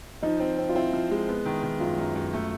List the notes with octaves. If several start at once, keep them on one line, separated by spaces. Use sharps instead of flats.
F3 D#4
C4
C4
F4
C4 E4
F3
G#3
B3
D#3
D#3
F#2 F4
F#2
F#2
A3